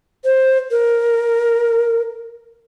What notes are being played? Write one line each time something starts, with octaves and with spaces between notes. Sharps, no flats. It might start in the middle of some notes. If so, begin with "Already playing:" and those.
C5
A#4